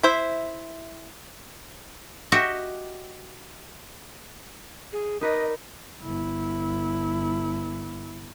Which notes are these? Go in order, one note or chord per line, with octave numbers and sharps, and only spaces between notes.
E4 C5 E5
F#4 G4 D#5 E5 F#5
G#4
D#4 A#4 B4 D5 D#5
G1 E4